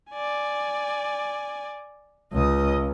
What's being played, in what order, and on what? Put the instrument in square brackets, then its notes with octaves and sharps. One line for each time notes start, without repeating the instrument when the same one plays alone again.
[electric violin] D5 G#5
[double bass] C#2 [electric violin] D#5 D#6